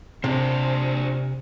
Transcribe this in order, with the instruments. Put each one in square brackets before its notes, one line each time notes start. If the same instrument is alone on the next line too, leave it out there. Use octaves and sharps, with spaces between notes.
[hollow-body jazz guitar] C3 [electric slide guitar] D4 C5